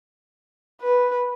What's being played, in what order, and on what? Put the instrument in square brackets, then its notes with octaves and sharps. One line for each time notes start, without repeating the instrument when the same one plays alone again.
[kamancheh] B4